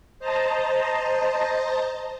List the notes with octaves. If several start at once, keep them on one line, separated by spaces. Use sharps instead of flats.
C5 D#5 A5 A#5